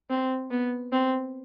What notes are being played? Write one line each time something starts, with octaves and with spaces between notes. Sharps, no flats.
C4
B3
C4